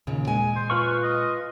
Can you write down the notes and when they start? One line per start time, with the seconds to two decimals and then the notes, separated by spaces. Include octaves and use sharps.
0.07 D#2 A#2 C#3
0.27 A#2 G#3 G#5
0.56 C5
0.70 F4 B4 F5 C#6
1.03 D#5